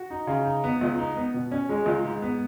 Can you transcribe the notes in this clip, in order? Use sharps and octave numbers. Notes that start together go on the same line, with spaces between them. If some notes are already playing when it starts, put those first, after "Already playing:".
Already playing: F#4
D#4
C#3
D#4
B3
C#2
D#4
B3
B2
C#4
G#3
C#2
G#2
B3